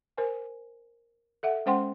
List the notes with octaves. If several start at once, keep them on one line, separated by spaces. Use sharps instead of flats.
A#4 C5 G#5
A4 E5 F#5
G#3 C#4 C5 F#5 G5 C6